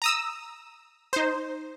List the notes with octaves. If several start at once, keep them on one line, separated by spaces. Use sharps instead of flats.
A#5 D#6 E6
D#4 C5